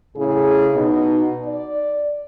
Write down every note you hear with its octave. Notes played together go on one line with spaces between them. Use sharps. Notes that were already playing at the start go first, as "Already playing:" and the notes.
A2 C#3 E4 G#4
B2 D#4
D5